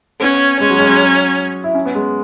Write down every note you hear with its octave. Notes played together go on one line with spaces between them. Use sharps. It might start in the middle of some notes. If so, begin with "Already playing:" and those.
B3 C#4
G#3 C#4
F#3
G#3
F#3
E4
C#4
B3
G#3